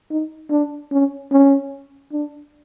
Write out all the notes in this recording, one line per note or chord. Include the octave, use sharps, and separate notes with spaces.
D#4
D4
C#4
C#4
D4